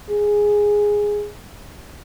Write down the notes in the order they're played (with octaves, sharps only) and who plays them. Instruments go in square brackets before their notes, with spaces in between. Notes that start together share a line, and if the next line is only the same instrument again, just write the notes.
[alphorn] G#4